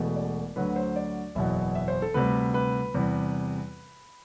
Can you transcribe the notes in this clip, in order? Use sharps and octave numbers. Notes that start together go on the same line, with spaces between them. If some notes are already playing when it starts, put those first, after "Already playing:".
Already playing: E1 E2 B2 A3
D5
D2 D3 F#3 B4
C5
D5
F#1 E2 B2 F#3 E5
E5
C5
A4
D2 C3 G3 B4
B4
E2 C3 G3